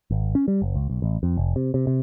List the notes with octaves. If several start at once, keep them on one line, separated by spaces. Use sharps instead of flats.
G#1
C#4
G3
F#1
C#2
B1
A1
F2
F1
C3
C3
C3